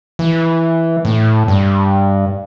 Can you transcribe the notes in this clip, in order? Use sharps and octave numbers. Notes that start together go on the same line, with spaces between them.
E3
A2
G2